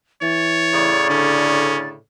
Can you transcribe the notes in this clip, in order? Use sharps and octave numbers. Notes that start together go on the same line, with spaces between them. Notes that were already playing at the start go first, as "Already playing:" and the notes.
E3 C#5 A6
A2 C#3 D5
D3 C#4